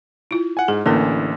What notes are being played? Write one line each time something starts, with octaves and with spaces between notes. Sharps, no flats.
E4 F4
F#5 G#5
G#2 G#4
A1 D3 E3 A#3 C#4 A#4